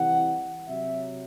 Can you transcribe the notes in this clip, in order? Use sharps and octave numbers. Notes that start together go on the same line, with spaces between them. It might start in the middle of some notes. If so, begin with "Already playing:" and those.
Already playing: C3 E3 G3 F#5
C3 F#3 E5